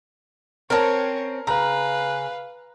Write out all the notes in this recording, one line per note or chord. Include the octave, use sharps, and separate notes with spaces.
C4 C#4 A#4 C#5 A5 A#5
C#3 B4 F5 A#5